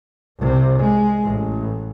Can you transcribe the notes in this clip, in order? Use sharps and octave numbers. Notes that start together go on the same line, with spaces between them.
C2 C3
G#3
A1